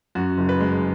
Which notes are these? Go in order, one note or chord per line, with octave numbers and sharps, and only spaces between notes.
F#2 F#4
F#1
B4
G#3